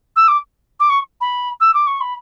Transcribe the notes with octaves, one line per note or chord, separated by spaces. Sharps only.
E6
D6
D6
C#6
B5
E6
D6
C#6
B5